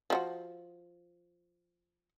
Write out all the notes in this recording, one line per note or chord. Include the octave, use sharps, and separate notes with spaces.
F3 E4 F#4